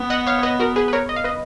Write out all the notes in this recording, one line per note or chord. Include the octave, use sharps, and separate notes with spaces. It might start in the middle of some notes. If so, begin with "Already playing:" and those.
Already playing: B3
D#5 F#5
C#5 F5
C#5
B4 D#5
F#4 A#4
G#4 B4
B4
A#4 C#5
D#5
F5
B4 D#5